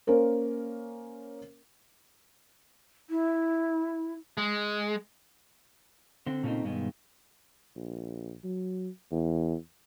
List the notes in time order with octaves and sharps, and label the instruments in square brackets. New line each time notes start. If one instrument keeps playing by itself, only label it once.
[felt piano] A#3 C#4 A#4 C5
[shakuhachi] E4
[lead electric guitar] G#3
[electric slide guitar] D3 C4
A#2 C#3 A3 A#3 C4 D#4
G2 B2 D#3 G#3 B3
[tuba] A#1
F#3
E2